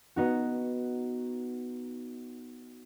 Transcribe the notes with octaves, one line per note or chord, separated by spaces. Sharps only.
B3 D#4 F#4